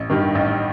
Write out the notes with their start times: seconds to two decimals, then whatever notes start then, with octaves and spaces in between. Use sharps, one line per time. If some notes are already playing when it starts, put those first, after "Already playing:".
Already playing: A1
0.10 G2 D#3
0.35 A1